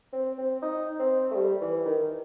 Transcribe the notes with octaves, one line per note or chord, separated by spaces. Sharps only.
C4
C4
D#4
C4
A3
G3
E3
D#3